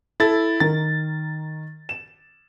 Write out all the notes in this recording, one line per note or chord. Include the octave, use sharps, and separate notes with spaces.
E4 A4 A6
D#3 A#4 A6
E7